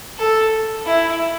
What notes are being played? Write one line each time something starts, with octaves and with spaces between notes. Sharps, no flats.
A4
E4